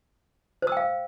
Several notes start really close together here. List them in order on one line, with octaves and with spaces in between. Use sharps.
C5 E6 G5 F5